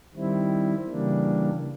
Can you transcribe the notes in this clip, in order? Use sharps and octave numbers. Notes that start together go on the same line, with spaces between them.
D#3 G3 C4 E4
C#3 E3 G3 A#3 D4